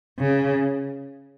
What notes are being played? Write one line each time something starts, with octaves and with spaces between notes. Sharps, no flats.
C#3